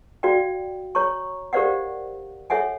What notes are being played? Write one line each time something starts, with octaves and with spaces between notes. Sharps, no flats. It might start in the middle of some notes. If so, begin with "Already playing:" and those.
F#4 D5 F5 G5
C#5 A#5 C#6
G4 A#4 C5 D5 F5 F#5
A4 C#5 E5 F#5 G#5